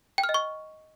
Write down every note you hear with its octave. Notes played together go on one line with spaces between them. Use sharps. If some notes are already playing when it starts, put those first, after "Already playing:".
G5
F6
D#5
C#6